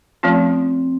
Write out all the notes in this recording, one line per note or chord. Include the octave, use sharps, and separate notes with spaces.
F3 A3 C4 C#4 F4